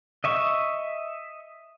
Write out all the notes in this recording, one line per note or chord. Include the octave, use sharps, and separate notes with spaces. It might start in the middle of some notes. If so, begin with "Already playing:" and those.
D#5 E5 C#6